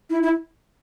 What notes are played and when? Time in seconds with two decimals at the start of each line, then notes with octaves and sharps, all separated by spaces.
0.10 E4
0.23 E4